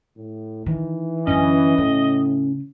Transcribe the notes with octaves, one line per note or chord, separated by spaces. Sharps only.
A2
D#3 E3
F#2 D3 C#4 D#5
A2 C#3